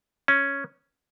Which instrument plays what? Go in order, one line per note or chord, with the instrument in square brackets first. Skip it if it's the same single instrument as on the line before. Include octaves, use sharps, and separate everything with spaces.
[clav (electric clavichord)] C#4